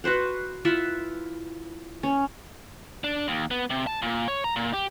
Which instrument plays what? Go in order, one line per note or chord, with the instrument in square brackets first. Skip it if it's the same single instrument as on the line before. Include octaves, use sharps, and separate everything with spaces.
[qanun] F#4 B4 C5 F#5
E4 F4 E5 F#5
C#4
[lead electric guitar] D4
D#2
B3
C3
A5
A#2
C#5
A#5
A#2
G4